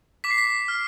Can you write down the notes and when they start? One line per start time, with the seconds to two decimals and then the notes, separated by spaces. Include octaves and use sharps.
0.24 D6 B6
0.31 C7
0.38 B6
0.68 F6